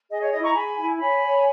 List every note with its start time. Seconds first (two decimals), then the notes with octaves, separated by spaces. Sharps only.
0.09 G#4 D#5
0.21 C#5
0.32 E4 D#5
0.43 A#5 C#6
0.54 G#4 G#5 B5
0.78 E4
1.00 C#5 G#5 B5
1.23 C#5